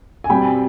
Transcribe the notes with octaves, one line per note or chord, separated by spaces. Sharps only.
G#5
B2 G3 C4 G5 B5